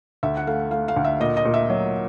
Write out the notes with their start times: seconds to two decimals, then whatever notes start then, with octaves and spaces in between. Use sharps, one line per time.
0.23 D2 E5
0.37 F#5
0.47 A3 F5
0.71 A3 F5
0.88 F5
0.96 D2
1.04 E5
1.20 A#2 D#5
1.37 D#5
1.45 A#2
1.54 E5
1.70 F#3